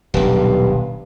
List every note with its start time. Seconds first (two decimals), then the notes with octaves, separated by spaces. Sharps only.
0.14 D#1 B1 G2